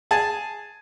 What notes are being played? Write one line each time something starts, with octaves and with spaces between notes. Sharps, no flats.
G#4 A5